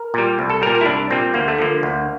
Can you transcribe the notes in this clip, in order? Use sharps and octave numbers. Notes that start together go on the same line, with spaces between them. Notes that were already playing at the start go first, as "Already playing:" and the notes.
Already playing: A#4
A#2 G3
C2
A4
A#2 G3 A#4
A#4
E4
C2 D4
A#2 G3 C4
D2 A#3
A3
D3 F3 A#3
D2